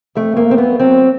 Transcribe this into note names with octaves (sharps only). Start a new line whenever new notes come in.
F2 A3
F2 A#3
F2 C4
B3
F#3
F#3 C4